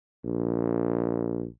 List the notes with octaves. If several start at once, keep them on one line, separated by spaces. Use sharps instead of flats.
A#1